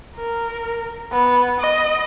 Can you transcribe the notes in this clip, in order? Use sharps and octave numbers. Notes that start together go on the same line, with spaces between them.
A#4
B3
D#5